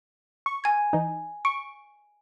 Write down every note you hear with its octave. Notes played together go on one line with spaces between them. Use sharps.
C#6
G#5 G#6
E3 D#4
C#6 D7